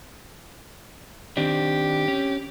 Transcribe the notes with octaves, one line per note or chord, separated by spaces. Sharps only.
D#3 C4 D4 G4
C#4